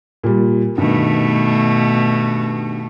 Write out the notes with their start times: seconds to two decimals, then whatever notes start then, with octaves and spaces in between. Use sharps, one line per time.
0.23 A#2 G3
0.78 G2 B2 D#3 A3